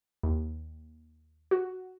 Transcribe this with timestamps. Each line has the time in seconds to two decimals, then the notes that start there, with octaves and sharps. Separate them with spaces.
0.23 D#2
1.51 F#4